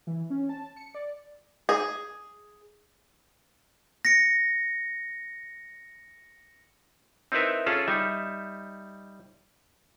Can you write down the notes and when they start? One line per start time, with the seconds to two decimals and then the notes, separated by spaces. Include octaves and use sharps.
0.07 E3
0.30 C#4
0.49 A5
0.77 C#7
0.95 D5
1.69 G#4
4.05 A#6 C#7
7.32 C4 D#4 E4 A#4 B4 E5
7.66 C#4 F4 G#4 A4 C#5 A5
7.88 G3 D#4 E5